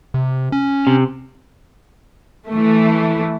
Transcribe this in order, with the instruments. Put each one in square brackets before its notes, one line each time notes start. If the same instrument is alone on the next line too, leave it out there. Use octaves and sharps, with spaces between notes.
[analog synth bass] C3
C#4
[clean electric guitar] C3
[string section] E3 A3